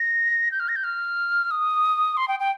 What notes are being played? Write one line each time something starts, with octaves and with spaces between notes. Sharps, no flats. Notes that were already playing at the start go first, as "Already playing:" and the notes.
Already playing: A#6
G6
F6
A#6
G6
F6
D#6
C6
G5
G5